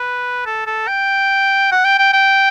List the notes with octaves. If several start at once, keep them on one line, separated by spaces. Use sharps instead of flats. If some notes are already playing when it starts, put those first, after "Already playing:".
Already playing: B4
A4
A4
G5
F#5
G5
G5
G5